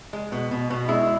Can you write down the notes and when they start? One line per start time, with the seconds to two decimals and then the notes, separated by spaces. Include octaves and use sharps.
0.13 G#3
0.32 B2
0.51 B2
0.70 B2
0.88 G#3 E4